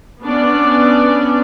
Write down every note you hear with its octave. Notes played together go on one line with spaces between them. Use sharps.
B3 C#4 D4 D5